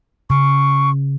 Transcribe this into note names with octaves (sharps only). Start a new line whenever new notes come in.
C#3 C#6